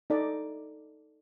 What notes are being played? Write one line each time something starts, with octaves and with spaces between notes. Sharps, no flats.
D#4 A4 D5 D#5